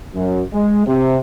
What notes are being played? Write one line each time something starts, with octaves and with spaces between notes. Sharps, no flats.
F#2
G#3
C3